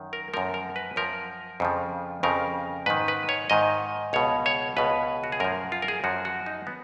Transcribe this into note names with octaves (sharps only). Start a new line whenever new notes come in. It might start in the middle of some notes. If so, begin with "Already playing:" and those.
Already playing: F#2 D#3
A#4
F#2 F3 A#4
A#4
B4
F#2 F3 A#4
F2 C#3 F3
F2 C#3 F3 A#4
G#2 D#3 B4
B4
C#5
G#2 D#3 D#5
C#2 B2 C#5
C#5
C#2 B2 B4
F#4
G#4
F#2 F3 A#4
F4
A#4
G#4
F#2 F3 F#4
F#4
D#4
B3